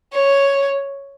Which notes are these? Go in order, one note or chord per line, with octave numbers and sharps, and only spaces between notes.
C#5